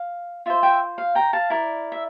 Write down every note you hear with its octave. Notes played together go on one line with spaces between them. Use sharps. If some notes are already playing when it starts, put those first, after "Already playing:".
Already playing: F5
F4 C5 E5
E5 G5
F5
G5 A#5
F5 A5
E4 A#4 D5
E5